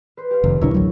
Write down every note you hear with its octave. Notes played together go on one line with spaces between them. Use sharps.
B4 C5
G4 F5
F1 D#2
D1 C2 D4 E4 A#4 C#5
A1 D2 F#3